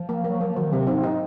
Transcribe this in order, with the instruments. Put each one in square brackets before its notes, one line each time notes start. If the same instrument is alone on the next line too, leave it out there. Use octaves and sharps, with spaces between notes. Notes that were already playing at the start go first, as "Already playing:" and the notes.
Already playing: [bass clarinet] F3
[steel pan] A#3
[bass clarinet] F#3 [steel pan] A#3
[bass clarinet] F3 [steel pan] A#3
[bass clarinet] D#3 [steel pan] F#3
[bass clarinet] C3 [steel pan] C4
[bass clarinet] G#2 [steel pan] C4
[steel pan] D#4